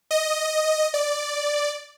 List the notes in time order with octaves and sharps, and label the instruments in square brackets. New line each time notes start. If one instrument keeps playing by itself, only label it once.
[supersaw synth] D#5
D5